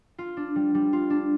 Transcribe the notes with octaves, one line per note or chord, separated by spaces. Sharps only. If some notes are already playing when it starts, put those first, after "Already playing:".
F4
D4
G3
G3
F4
D4